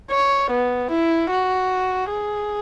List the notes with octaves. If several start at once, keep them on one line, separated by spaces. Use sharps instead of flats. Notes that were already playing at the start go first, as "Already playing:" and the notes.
C#5
B3
E4
F#4
G#4